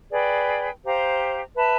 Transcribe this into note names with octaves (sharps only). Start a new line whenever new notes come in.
G#4 B4 D5 G5
G4 C5 F5 A#5
B4 E5 A5